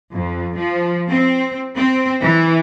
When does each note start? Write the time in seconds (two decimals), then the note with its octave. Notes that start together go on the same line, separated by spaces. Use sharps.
0.12 F2
0.57 F3
1.09 C4
1.77 C4
2.22 E3